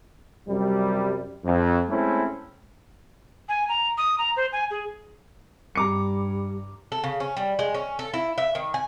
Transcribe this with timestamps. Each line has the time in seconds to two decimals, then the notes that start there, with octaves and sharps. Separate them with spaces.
0.47 F#2 C3 G3
1.44 F2
1.89 G#3 A3 C4 C#4 E4
3.49 G#5
3.69 A#5
3.98 D#6
4.18 A#5
4.37 C5
4.52 G#5
4.71 G#4
5.75 G2 G3 A#5 D6 C#7
6.92 A4
7.04 C#3
7.20 C#4
7.37 G3
7.59 G#3
7.74 C#4
7.99 A4
8.13 E4
8.38 E5
8.55 D#3
8.74 G#5